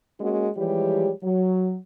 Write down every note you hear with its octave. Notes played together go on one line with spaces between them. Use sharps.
G#3 A#3 C#4 F#4
E3 F3 G3 G#3 G4 C#5
F#3